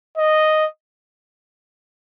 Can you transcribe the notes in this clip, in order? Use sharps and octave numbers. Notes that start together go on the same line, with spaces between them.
D#5